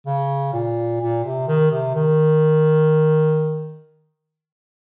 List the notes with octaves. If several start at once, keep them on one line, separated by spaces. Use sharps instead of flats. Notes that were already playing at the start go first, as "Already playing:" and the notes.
C#3
A#2
A#2
C3
D#3
C3
D#3